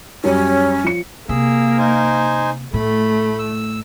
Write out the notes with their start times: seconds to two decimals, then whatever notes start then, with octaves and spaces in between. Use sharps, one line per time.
0.24 F#2 G3 C#4
0.84 F3 C#7
1.29 C3 A#3 G#4 E6
1.78 D#4 C5 G#5
2.74 A2 A3 B5
3.39 E6